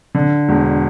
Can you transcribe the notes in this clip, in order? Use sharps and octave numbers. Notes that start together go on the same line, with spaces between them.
D3
E1